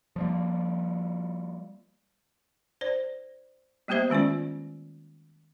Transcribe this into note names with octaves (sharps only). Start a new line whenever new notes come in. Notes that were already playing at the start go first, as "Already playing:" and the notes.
F3 G3 A#3
C5 D5
G3 A#3 B3 G4 C5 E5
D#3 G#3 C#4 F4 D5